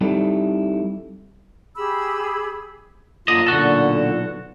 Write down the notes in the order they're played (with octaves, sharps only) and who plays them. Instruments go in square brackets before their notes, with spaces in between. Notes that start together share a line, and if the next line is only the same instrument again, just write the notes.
[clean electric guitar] G3 C4 D#4 E4 G4 A4
[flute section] G4 G#4 B5 E6
[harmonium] F#2 A#3 F4 [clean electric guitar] D3 D#5
[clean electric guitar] B1 F#4 A4 [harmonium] A#2 D3